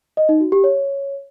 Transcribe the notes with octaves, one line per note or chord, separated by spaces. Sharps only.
D#5
D#4
F#4
G4
C#5